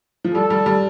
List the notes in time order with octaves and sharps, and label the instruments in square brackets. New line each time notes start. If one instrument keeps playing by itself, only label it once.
[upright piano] F3
[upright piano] G3 [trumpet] A4
[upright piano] G3
G3